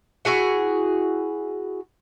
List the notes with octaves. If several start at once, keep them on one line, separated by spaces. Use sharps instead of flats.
E4 F#4 G#4 F#5